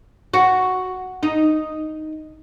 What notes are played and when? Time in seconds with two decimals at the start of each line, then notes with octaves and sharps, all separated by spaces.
0.34 F#4
1.23 D#4